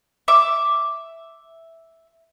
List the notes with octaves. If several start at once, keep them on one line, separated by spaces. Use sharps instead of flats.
E5 D6